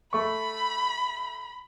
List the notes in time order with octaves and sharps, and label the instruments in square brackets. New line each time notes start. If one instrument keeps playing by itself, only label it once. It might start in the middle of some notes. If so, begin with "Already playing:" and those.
[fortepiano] A3 C#6 [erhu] B5